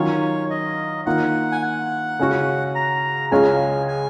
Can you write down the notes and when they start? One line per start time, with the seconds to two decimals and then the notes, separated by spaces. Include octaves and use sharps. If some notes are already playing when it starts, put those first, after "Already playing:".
Already playing: D#3 F#3 C#4 F4 C#5
0.50 D#5
1.06 D#3 A#3 F4 F#5
1.52 G#5
1.62 F#5
2.19 C#3 G#3 C#4 F#4
2.75 A#5
3.32 C#2 C#3 G#3 C#4 F4 G#5
3.88 G#5